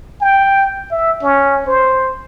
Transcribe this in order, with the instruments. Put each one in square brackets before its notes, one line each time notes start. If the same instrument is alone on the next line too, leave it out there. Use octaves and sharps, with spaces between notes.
[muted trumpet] G5
E5
C#4
C5